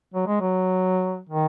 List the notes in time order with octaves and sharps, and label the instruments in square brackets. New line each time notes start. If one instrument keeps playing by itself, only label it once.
[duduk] F#3
G#3
F#3
D#3